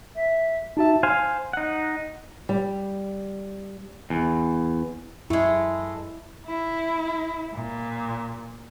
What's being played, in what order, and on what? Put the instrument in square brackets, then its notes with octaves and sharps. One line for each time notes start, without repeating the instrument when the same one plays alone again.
[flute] E5
[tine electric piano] D#4 F#4 E5 [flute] A5
[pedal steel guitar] C5 F5 G#5
D#4 F#5
[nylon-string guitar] G3
[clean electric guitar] E2
[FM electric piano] F#2 [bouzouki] G#3 A3 [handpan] E4
[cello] E4
A#2